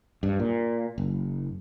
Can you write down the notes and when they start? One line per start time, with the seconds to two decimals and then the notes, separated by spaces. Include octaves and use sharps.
0.23 G2
0.39 A#2
0.98 F#1